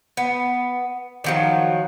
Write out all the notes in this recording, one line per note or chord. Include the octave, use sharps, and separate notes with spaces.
B3
D#3 F3 F#3